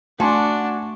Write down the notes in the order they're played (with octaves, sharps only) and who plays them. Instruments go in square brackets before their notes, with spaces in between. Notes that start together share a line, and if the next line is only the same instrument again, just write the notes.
[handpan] A3 [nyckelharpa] D4 [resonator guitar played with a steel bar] F#4 [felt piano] G#5 A5 C6